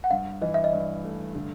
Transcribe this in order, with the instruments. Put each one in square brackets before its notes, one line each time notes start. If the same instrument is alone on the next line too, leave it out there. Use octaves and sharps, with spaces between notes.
[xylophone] F#5
[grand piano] G2 [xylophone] F5
[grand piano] E3 [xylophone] D#5
[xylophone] E5
D#5
[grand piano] G2 [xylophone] D5
[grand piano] A3
D3